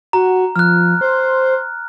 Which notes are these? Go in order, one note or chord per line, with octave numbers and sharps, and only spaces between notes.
F#4 A#5
F3 F6 F#6
C5